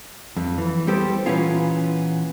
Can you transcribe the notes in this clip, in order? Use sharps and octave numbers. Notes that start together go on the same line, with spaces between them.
F2
E3
G3 B3 G4 A4 C5
A#2 E3 A#3 B3 C#4 F4